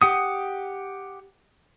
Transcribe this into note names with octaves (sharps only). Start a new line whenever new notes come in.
G4 F#5 D#6